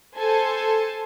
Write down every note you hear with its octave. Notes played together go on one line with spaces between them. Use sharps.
A4 C5 G#5 A5